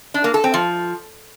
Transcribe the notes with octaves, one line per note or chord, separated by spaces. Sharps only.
D4
A#3
A4
C4
F3